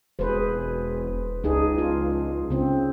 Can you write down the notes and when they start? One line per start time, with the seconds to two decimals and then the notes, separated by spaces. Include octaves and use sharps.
0.19 E1 G#4 B4 C5
1.44 C#2 D4 D#4 G#4
1.78 F4
2.50 C#3 C4